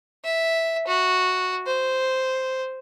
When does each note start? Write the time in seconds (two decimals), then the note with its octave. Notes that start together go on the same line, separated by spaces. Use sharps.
0.25 E5
0.87 F#4
1.66 C5